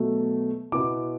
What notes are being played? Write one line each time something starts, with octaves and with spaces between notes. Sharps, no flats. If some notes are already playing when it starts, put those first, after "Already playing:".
Already playing: B2 F#3 A3
B2 B3 E4 D6